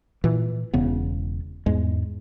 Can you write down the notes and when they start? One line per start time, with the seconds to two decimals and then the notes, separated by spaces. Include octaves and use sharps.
0.24 A#2 E3
0.74 E1 E2 C#3 B3
1.66 E2 G#2 G#3